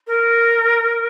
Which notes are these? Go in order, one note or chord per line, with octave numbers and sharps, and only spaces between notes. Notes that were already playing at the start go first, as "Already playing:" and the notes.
A#4